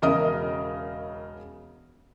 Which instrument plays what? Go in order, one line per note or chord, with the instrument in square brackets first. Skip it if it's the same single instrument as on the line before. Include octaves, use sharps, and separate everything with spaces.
[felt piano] E1 C#3 A#4 D#5 E5 D#6